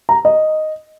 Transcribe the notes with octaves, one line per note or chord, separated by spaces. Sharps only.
A#5
D#5